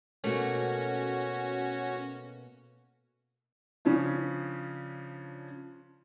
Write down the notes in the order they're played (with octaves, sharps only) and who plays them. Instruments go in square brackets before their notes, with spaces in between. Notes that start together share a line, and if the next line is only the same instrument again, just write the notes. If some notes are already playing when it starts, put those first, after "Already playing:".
[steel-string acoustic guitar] B2 A3 A#3 [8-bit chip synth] C#4 F#4
[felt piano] C#3 F3 C#4 D4